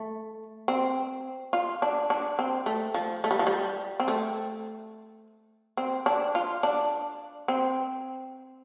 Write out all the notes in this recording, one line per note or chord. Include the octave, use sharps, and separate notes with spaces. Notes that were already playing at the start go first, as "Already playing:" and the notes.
Already playing: A3
C4
F4
D4
D4
C4
A3
F3
A3
G3
F3
G3
C4
A3
C4
D4
F4
D4
C4